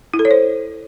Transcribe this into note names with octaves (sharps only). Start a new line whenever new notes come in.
E4
A4
C#5
C5